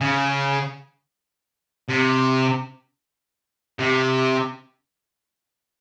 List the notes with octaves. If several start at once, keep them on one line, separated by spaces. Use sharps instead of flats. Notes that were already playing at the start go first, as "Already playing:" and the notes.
C#3
C3
C3